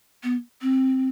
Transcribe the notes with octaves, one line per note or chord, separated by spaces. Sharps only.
B3
C4